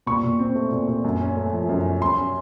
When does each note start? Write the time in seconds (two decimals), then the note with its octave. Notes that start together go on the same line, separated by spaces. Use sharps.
0.06 A#2 C#6
0.23 A#2
0.39 C4
0.55 A3
0.71 A#2
0.88 A#2
1.04 F#2
1.20 C#4
1.37 A3
1.53 F3
1.69 F#2
1.86 C#4
2.01 F#2 C6
2.18 C#4